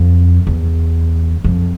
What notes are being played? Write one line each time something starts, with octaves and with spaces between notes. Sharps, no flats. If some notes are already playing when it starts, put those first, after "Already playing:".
Already playing: F2
E2
F2